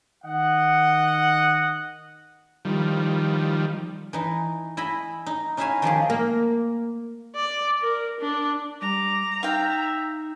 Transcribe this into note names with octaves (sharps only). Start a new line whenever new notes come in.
D#3 D#5 F#5
D#3 F3 G3
E3 D#4
E4 D#5 G#5 B5
D#4
C#4 D#4 E4 E5 F5 G#5
D#3 F3 G4 G#4
A#3
D5
A#4
D4
G3 A#5 D6
D#4 E5 F5 G5